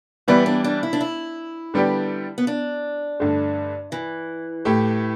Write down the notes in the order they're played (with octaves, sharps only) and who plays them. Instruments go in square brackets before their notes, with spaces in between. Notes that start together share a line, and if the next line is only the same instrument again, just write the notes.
[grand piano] E3 G3 E4 B4 D5 [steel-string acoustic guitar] B3
[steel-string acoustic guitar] D4
D4
E4
D4
E4
[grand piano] D3 G3 B3 G4 D5
[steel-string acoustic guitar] B3
D4
[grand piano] G2 D3 A3
[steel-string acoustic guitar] E3
[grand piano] A2 A3 G4